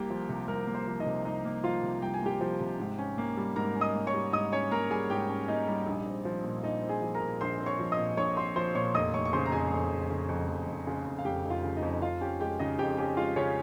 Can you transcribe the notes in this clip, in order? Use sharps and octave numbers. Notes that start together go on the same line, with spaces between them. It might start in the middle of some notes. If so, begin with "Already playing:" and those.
Already playing: C2 A#3 G4 G5
F3
C3
C2 A#4
A#3
C5
F3
D#4 D#5
C3
C2 D#4 D#5
A#3
F3 F4 F5
C3
C2 G5
G#5
A#3 G4 G5
F3
C3
G#2
C#4
A#3
G3
G#2 A#4 A#5
C#4
D#5 D#6
A#3
C#5 C#6
G3
G#2 D#5 D#6
C#4 C#5 C#6
A#3 A#4 A#5
G3 G#4 G#5
G#2 G4 G5
C#4
A#3 D#4 D#5
G3
A#1
C4
F3
A#2
A#1 D#4 D#5
C4
G#4 G#5
F3
A#4 A#5
A#2
A#1 C5 C6
C4
C#5 C#6
F3
D#5 D#6
A#2
A#1 C#5 C#6
C4 C5 C6
F3 C5 C6
A#2 C#5 C#6
F1 D#5 D#6
F1 C#5 C#6
C#6
C#3 C5 C6
A#5
F2 G#4 G#5
F1
F1
C#3
F2
F1
F1
C#3
F2
F5
F1 G4 G5
F1
F4 F5
C#3
D#4 D#5
F2
F2 F4 F5
C#4 G4 G5
G#3 G4 G5
C#3 D#4 D#5
F2 G4 G5
C#4 G4 G5
G#3 F4 F5
C#3 C#4 C#5